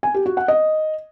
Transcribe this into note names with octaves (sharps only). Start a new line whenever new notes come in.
G#5
G4
F#4
F#5
D#5